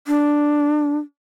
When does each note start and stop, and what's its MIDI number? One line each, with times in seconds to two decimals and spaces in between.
0.08 0.97 62